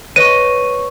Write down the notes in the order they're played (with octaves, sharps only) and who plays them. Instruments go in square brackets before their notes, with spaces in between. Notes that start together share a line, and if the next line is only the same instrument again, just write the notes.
[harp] B4 D#5 [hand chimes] C#5 C#6 [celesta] D#7